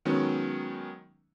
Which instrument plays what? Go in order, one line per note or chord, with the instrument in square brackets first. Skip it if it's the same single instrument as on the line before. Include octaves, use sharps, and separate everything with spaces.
[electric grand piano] D#3 F#3 G#3 B3 C#4